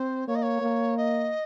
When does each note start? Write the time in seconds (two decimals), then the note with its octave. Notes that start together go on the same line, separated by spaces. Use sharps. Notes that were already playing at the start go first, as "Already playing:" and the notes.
Already playing: C4 C5
0.27 A#3 C#5
0.35 D#5
0.42 C#5
0.61 A#3
0.97 D#5